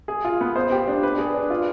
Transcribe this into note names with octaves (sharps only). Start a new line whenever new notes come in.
G#4
F4
B3
C5
G4
D4
B4
G#4
D4
F4